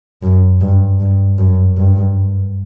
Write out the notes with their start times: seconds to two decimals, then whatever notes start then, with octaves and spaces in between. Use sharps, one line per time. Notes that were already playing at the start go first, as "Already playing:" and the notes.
0.23 F#2
0.61 G2
1.00 G2
1.38 F#2
1.77 G2